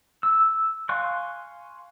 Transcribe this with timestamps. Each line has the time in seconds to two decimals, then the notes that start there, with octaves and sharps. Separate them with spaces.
0.23 E6
0.89 F5 G#5 C6 C#6 F#6